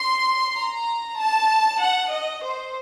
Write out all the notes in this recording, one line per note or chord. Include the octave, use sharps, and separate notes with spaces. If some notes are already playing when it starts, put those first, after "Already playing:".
Already playing: C6
A#5
A5
F#5
D#5
C5